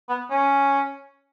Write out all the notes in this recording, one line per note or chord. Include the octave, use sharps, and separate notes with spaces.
B3
C#4